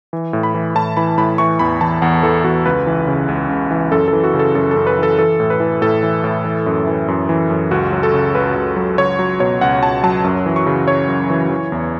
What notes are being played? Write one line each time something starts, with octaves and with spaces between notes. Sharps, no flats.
E3
A2
B5
E3
A2 A5
E3 B5
A2 B5
E3 C#6
E2 B5
E3 A5
E2 F#5
E3 A4
E2 F#4
C#2 B4
E3
C#3
C#2
C#2
E3
F#2 A4
A4
E3
F#4
C#3
A4
F#2 A4
F#2 A4
B4
E3
A4
E3 A4
A2
B4
E3
A2 A4
E3
A2
E3
F#2
E3
F#2
E3
F#2
C#2 F#4
F#3
A4
C#3
C#2 B4
C#2
F#3
C#2 C#5
F#3
B2 C#5
C#2 F#5
C#2 A5
F#3 A5
F#2
E3
C#6
C#3
F#2 C#5
F#2
E3
E3
E2